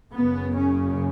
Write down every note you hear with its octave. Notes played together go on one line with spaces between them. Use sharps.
F#1 F#2 C#3 B3
C#4